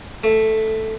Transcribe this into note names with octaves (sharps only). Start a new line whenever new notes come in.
A3